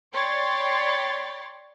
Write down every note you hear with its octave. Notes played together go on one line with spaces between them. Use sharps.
C#5 D5 G5 B5 C6 A6